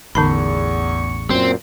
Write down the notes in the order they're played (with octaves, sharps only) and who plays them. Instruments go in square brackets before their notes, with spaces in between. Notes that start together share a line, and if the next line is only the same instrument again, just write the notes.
[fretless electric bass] A1 [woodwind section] E2 C#6 [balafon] D3 D#4 B5
[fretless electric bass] F#2 A#2 [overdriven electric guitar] C4